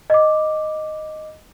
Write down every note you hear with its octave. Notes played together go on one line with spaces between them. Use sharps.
D#5 D6